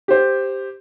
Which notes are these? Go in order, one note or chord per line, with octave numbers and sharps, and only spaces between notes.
G4 C5